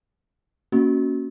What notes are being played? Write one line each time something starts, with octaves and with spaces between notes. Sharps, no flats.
A#3 C#4 F#4